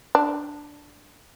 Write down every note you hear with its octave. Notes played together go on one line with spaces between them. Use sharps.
D4